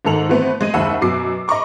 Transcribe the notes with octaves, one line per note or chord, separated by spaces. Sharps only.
G#2 D#3 A4 F7 F#7
E3 A3 B3 C4
G#3 D#5 D#7
F#1 D#2 E5 F#5 B5 E6
F#2 B2 D6 C7
D#5 A#5 B5 C#6 D6